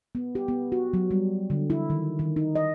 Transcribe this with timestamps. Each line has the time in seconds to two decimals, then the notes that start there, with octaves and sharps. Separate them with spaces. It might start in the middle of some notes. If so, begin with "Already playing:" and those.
0.15 B3
0.35 G4
0.48 B3
0.72 F#4
0.93 F#3
1.11 G3
1.50 D3
1.70 E4
1.90 D#3
2.19 D#3
2.36 D#4
2.55 D#5